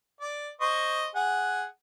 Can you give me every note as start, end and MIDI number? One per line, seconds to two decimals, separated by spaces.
0.21 0.49 74
0.61 1.08 72
0.61 1.08 75
0.61 1.08 85
1.15 1.64 68
1.15 1.64 78